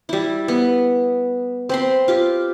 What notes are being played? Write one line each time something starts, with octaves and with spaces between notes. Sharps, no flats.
G3 E4
B3
C4 B5 C6
F4 G4